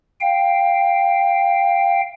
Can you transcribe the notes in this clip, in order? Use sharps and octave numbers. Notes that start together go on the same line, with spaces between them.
F5 G5